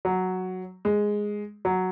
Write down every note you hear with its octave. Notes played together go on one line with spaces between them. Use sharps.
F#3
G#3
F#3